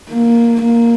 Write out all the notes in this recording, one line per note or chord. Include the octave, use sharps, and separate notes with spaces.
A#3
A#3